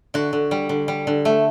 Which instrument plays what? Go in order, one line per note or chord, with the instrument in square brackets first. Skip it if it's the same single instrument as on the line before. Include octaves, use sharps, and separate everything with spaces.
[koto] D3 F#4
D3
G3
D3
G3
D3
A3